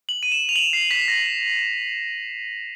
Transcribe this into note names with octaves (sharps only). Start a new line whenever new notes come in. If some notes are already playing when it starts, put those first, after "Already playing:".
F#7
D#7
E7
F7
F#7
C7
B6
A#6